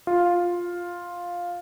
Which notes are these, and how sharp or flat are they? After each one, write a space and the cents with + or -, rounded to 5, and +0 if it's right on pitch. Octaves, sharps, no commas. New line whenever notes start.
F4 +5